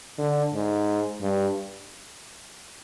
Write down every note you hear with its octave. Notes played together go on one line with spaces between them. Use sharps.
D3
G#2
G2